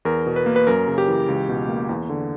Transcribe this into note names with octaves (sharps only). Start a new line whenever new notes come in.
E2 A#4
B2
B4
A#3
B4
F#2 A#4
C#3
G4
E3
C#2
B2
A#3
E2
D3